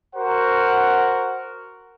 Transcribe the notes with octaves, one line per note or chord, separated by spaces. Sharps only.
F#4 A#4 C5 F#5